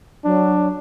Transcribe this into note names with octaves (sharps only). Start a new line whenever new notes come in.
F#3 D4